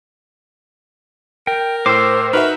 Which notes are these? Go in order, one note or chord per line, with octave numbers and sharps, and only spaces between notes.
A#4 G5
A2 C5 G5 D6 E6
D#4 F#4 A#4 B4 E5